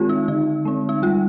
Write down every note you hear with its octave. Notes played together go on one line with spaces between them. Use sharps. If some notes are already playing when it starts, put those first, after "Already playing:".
Already playing: D#3 G#3 C4 F4 G4
D#4
D3 D#4
G#3 C4
D#4
G3 F4